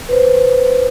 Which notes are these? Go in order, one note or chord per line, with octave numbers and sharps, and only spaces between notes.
B4 C5